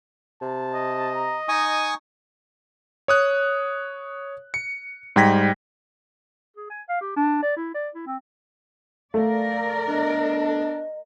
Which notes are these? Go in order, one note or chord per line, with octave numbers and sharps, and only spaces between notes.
C3 A5
D#5
A#5
D#4 G#5 C#6 D#6
C#5 D#6 F#6
C#7
G#2 G3 G5 G#6 A#6 B6
G#4
G#5
F5
G4
D4
D5
E4
D5
E4
C4
A3 A#4 D5 F5
B3 D4 D#5